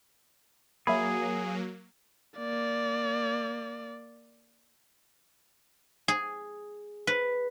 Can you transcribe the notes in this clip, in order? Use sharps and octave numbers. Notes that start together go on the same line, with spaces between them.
F#3 A#3 G#4 E5 B5
A#3 D5
G#4
B4